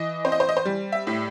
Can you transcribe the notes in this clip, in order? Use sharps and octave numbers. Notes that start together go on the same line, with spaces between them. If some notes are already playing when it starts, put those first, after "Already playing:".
Already playing: E3 D#5
C4 C5
D#5
C5
D#5
C5
G3
E5
A2